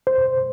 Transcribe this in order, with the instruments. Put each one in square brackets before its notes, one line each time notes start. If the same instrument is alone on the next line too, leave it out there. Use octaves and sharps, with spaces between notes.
[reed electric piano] C5